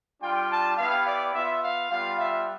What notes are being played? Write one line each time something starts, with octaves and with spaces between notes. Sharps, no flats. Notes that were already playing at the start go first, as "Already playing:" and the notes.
G3 D4 F4 G5
A5
B3 E4 G4 F5
D5
B3 F4 E5
F5
G3 B3 F4 F5
E5